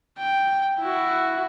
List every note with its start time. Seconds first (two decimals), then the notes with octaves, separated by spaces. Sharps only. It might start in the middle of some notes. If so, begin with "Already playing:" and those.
0.19 G5
0.80 E4 F#4